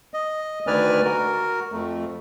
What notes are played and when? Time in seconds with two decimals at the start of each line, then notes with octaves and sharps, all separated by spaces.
0.14 D#5
0.67 D2 D#3 B4 D5 G#5 F6
1.04 F#4 A#4
1.72 F2 A3